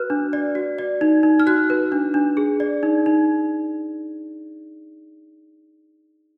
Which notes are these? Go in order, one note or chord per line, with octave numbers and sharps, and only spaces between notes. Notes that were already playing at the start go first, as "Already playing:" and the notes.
Already playing: F#4 B4 F6 F#6
D4
D5
F#4
D5
D#4
D#4
F6
F#4 F#6
B4
D4
D4
G#4
D5
D#4
D#4